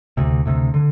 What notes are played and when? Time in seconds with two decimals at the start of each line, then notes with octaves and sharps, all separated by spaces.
0.17 D2 C3
0.46 D2 C3
0.74 D3